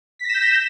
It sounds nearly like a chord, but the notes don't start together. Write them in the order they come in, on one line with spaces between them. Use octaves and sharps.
B6 A#6 E7 G6